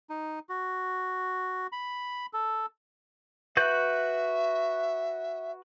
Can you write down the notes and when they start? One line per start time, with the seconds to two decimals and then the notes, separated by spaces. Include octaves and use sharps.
0.10 D#4
0.49 F#4
1.72 B5
2.33 A4
3.57 F#4 B4 E5 G6